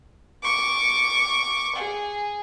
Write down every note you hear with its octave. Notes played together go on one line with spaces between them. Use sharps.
C#6 D6
G#4